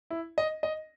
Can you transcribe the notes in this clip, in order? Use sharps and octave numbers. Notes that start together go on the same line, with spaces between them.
E4
D#5
D#5